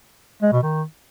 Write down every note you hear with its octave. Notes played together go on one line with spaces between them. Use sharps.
G#3
B2
D#3